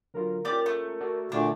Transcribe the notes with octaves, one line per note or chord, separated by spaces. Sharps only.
D3 F#3 F4 A#4
A#3 C#4 F4 G4 D5
A3
F#4 A4 D5
A#2 D3 A3 D4